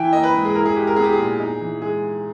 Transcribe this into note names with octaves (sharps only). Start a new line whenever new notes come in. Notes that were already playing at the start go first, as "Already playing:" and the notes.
Already playing: E3 E4 G5 G#5
A#3 D#5
B4
G#2
G#4
E4 A#4
G#4
G#3 G4
A#4
B3 G#4
G4
G#4
A#2
D#4
E3
G#3 G#4